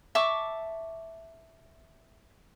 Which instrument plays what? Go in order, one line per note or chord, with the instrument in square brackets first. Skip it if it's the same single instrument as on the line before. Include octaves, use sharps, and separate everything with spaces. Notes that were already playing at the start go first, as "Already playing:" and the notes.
[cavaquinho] E5 A5 C#6 D6